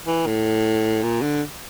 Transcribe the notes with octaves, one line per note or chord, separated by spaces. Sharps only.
E3
A2
A#2
D3